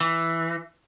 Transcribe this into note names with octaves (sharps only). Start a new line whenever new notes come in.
E3